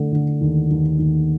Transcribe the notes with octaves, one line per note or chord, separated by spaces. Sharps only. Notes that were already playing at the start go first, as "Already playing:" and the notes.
Already playing: D3 A3
D3
D#2
D#2
D#2